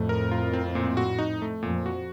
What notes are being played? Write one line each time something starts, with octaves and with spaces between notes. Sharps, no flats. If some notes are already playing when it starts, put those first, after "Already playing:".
Already playing: F2 A2 A3
A#4
F4
C4
A#2
F#4
D#4
A3
F2 A#2
F#4